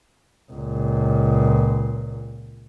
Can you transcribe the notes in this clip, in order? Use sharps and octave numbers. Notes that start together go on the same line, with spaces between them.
C#2 A#2